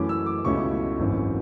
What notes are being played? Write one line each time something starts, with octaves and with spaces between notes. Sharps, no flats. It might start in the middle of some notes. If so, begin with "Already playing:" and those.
Already playing: F#2 E3 A3 C#4 E4 D6
E6
D6
C#2 B2 A3 C#4 E4 C#6
G#1 F#2 E3